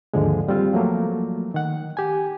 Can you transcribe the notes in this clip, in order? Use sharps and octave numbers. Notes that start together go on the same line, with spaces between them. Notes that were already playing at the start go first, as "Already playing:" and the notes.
D#2 G#2 D3 F3 G#3
G3 C4 F4
F3 F#3 A3 A#3
D#3 F#5
G4 G#5